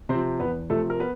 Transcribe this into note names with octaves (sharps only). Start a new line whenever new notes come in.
C3 C4 C5
F3
E2 B3 B4
C3 F3 A3 A4
A#4
B3 B4